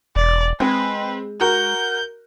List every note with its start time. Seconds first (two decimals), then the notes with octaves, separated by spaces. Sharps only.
0.16 E1 D5
0.60 G#3 C4 B4
1.41 F#4 A#4 G6